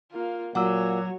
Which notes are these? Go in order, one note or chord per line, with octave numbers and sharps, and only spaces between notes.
A#3 F4
A#2 F#3 F#4 C#5 F#5 D6 E6